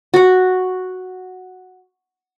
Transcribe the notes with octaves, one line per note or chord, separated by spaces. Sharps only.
F#4 F#5